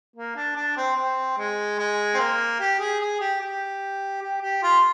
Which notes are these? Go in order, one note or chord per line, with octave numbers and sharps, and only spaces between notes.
A#3
D4
D4
C4
C4
G#3
G#3
C4
A#3
G4
G#4
G#4
G4
G4
G4
G4
F4